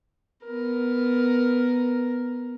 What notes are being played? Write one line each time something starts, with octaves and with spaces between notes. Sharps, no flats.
B3 A#4